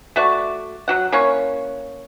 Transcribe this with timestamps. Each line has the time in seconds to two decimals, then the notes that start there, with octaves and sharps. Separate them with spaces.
0.16 A3 F#4 D5 C#6
0.88 F#3 F#4 F#5
1.12 A#3 C#4 E4 C#5